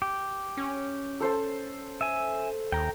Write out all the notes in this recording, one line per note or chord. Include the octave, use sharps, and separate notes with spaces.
G4
C#4
A4 C5 A5
E5 G#5
D#2 G5 A#5